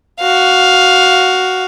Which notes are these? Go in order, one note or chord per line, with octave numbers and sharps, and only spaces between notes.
F#4 F5